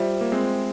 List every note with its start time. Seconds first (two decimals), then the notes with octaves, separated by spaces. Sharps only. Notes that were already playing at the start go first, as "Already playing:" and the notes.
Already playing: G3 F4 C5 E5
0.21 A#3
0.32 G#3 C4